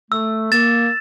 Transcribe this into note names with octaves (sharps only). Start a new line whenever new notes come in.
A3 E6
A#3 A6 E7